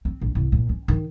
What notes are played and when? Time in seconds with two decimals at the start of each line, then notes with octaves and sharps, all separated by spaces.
0.05 C4
0.21 A#1
0.35 C2
0.52 A#2
0.69 C#4
0.88 D#3